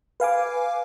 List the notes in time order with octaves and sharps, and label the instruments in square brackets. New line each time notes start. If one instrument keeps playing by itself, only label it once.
[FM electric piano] B4 F5 G#5 D6